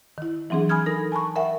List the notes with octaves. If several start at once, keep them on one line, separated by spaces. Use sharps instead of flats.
D#3 E4
E3 F#3 C4 D4 G#4
G#5 B5 D#6 F6 G#6
D#4 A4 A#4 A#6
G#5 A5 B5 C#6
A#4 E5 F#5 G5